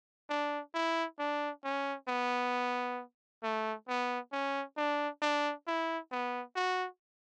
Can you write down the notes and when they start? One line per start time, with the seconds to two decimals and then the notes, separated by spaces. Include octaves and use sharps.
0.30 D4
0.74 E4
1.19 D4
1.64 C#4
2.08 B3
3.43 A3
3.88 B3
4.32 C#4
4.77 D4
5.22 D4
5.67 E4
6.12 B3
6.56 F#4